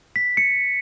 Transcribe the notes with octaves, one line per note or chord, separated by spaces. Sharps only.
B6
C#7